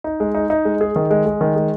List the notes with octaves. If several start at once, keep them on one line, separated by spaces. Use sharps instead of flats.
D#4
G#3
D#4
D#4
G#3
G#4
D#3
G#3
G#3
D#3
G#3